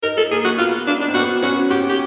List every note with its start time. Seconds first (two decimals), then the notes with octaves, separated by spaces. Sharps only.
0.03 D#4 A#4
0.17 A4
0.31 A#3 G#4
0.45 F#4
0.58 B3 F4
0.87 D4
1.01 D4
1.08 C4
1.14 B3 F#4
1.42 C#4 F#4
1.70 F#4 G4
1.89 G4